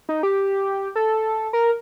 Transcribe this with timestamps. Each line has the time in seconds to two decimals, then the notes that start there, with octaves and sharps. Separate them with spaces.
0.09 D#4
0.23 G4
0.96 A4
1.53 A#4